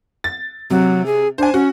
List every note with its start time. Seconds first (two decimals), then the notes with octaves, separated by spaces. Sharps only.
0.24 A6
0.70 C3 F#3
1.06 G#4
1.38 D4 C5 G#5
1.54 C#4 F#4